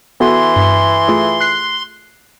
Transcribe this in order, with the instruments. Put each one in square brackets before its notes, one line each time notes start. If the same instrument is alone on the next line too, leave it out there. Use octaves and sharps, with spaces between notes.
[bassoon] E3 [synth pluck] B3 F#4 A4 [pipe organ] C6
[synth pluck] G2
A3 F4 G#4
F#6 C7